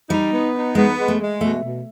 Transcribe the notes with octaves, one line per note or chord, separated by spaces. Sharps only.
G3 D#4
B3
D#4
G#3 B3
G#3
A3
G#3
B2 A3
B2